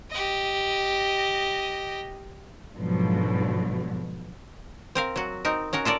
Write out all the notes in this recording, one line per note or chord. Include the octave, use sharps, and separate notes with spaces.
G4 D#5
G#2 B2 D3 F3 F#3
C4 A#4 F5
F#3 F#4
C4 D#4 A#4
C#4 F#4 A#4
F4 A4 A#4 D5